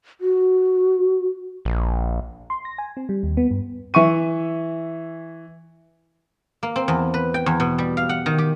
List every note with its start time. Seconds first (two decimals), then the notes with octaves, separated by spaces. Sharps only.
0.21 F#4
1.65 A#1
2.50 C6
2.65 A#6
2.78 G#5
2.97 C4
3.09 G3
3.23 D#2
3.37 B3
3.51 G2
3.94 E3 E5 C#6 D#7
6.63 A#3
6.76 C4
6.88 E2
7.14 B4
7.34 G5
7.46 E2
7.60 B2
7.78 G3
7.97 F5
8.09 F#5
8.26 D#3
8.38 G4